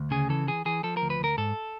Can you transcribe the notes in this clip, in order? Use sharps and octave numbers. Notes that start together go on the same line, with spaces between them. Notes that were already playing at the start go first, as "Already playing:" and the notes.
Already playing: D2
C#3 G#4
E3 A4
E3 G#4
E3 G#4
F3 A4
A#4
D2
B4
D2 A#4
G#2 A4